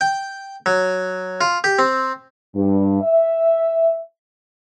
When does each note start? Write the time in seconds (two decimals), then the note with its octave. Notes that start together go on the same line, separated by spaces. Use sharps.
0.01 G5
0.66 F#3
1.41 F4
1.64 G4
1.79 C4
2.55 G2
3.01 E5